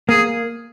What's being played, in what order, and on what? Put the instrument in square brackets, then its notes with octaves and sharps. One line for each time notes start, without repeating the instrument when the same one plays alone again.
[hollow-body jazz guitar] A#3 [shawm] G#4